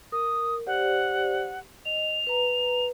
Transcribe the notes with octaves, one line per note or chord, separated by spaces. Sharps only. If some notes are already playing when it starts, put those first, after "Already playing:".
A#4 D#6
G4 C5 D5 F#5
D#5 F7
B4 A#5